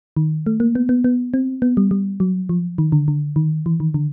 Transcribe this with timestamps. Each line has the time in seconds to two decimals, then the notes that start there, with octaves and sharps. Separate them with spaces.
0.17 D#3
0.46 A3
0.60 A#3
0.75 B3
0.89 B3
1.04 B3
1.34 C4
1.62 B3
1.77 G3
1.91 G3
2.20 F#3
2.49 F3
2.78 D#3
2.92 D3
3.08 D3
3.36 D#3
3.66 E3
3.80 D#3
3.94 D3